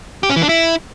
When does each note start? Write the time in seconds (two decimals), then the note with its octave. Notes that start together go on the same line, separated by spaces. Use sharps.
0.23 G4
0.30 C#4
0.36 E3
0.43 D4
0.49 E4